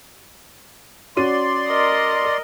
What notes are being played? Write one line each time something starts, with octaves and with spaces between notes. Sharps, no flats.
C#4 F#4 D5 C6 D#7
A#4 D#5